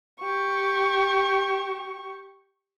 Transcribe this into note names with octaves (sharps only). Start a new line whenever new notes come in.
G4 C#6